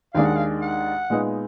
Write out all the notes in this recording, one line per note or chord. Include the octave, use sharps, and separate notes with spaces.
D#2 D#3 G#3 D4 F5
F#5
F5
F#5
A#2 G#3 B3 D#4